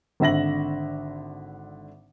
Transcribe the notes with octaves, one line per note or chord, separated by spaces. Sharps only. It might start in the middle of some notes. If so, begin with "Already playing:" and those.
G#1 D3 E5 A#6 F#7